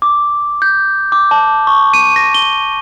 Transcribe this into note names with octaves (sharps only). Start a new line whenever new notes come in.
D6
G6
D6
A5
C#6
D#7
A#6
G7